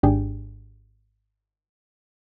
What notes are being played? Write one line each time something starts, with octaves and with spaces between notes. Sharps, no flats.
G#1 G#2 D4 G4 G#4 G5